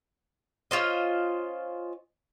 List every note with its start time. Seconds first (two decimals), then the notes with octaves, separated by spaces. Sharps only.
0.71 C#4 F4 C5 D#5